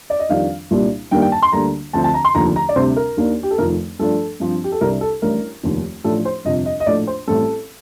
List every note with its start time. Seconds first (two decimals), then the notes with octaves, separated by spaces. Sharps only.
0.10 D5
0.19 D#5
0.29 F2 D#3 G3 D4 F5
0.71 C2 A#2 G3 A#3 D4
1.11 G2 D#3 G3 A#3 D4 G5
1.22 G5
1.32 A5
1.42 C6
1.52 D2 D3 G3 A#3 A#5
1.93 D2 D3 F3 C4 A5
2.04 A5
2.14 A#5
2.25 C6
2.35 F1 D#2 D3 F3 A#5
2.56 A#5
2.69 D5
2.76 D2 C3 G3 C4 C5
2.96 A#4
3.17 D#2 D#3 A#3 D4
3.43 G4
3.51 A4
3.58 F1 F2 D#3 A3 A#4
3.99 G2 F3 A3 D4 A4
4.40 G2 F3 C4
4.64 G4
4.72 A4
4.81 C2 C3 G3 D4 A#4
5.01 A4
5.22 A1 A2 G3 D4 A#4
5.63 F1 D#2 D#3
6.04 A1 A2 F3 A3 D4 A4
6.25 C5
6.45 G1 F2 C3 D#5
6.66 D#5
6.80 D#5
6.86 A#1 A2 A3 D5
7.07 C5
7.27 A1 A2 G3 C4 A4